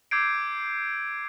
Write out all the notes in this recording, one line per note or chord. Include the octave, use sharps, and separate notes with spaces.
D6 E6 G6 G#6 C7 D7